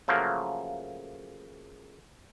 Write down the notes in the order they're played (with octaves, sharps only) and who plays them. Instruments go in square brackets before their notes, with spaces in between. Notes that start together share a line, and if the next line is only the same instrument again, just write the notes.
[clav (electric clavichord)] C#3 F3 F#3 A3 A#3